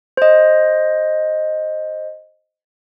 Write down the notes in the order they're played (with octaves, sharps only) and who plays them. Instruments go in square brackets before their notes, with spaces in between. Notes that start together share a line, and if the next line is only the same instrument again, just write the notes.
[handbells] C5 D#5